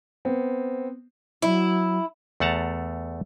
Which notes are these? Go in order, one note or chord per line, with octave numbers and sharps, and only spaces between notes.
B3 C4
F#3 E4
E2 A3 F#5 A5 A#5